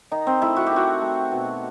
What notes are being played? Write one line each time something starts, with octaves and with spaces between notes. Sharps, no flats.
D#3 D#4
C4
A3 E4
F#4
G4
D#3 F#4
A3
B2